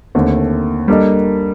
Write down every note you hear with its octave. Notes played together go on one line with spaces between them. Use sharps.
D#2 D3 A3 C4
G3 A#3 D4 A4 D#5